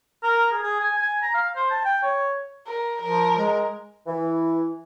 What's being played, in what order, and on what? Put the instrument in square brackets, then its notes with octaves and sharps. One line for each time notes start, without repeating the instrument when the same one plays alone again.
[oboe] A#4
G#4
G#4
G#5
G#5
A#5
F5
C5
A5
G5
C#5
[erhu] A#4
[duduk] F3 [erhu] A#4
[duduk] G#3
[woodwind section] E3